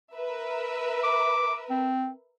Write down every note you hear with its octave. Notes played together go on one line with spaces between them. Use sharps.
A#4 B4 E5
D6
C4